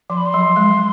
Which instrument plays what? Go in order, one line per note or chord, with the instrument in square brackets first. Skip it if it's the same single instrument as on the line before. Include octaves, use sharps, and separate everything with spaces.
[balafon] F3 [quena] C6
[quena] B5
C6
[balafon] F#3
G#3